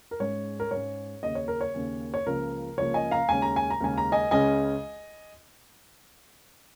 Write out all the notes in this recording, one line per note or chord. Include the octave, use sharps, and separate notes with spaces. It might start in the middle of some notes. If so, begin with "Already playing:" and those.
A#4
G#2 G#3 C#4 C#5
A#4
G#2 G#3 C#4 C#5
D#2 C#3 A#3 C#4 D#5
C#5
A#4
C#5
D#2 C#3 A#3 C#4
C#5
C#2 C#3 F3 A#3 A#4
C#2 C#3 F3 A#3 C#5
D#5 G#5
F5 A#5
D#2 C#3 G#3 C#4 G#5
A#5
G#5
A#5
D#2 C#3 G#3 C#4 G#5
A#5
D#5 G#5
C#2 C#3 G#3 C#4 D#5 G#5